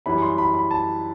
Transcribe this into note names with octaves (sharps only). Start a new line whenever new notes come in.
F#2 E3 G3 B5
C6
B5
B5
A5